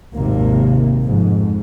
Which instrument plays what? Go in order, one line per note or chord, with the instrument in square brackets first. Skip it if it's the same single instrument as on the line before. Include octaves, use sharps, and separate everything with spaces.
[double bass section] G#1 D#2 C3 A#3
F2 G#2